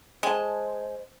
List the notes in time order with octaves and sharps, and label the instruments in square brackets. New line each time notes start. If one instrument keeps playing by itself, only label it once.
[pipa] G#3 [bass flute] C5 [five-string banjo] G#5 A5